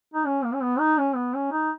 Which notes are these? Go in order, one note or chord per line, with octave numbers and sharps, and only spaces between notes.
D#4
C#4
A#3
C#4
B3
D#4
C#4
B3
C#4
D#4